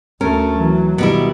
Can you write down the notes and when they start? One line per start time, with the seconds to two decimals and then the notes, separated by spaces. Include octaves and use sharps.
0.21 D2 A3 C#4 A#4
0.55 E3 F#3
0.98 B2 D#3 G3 E4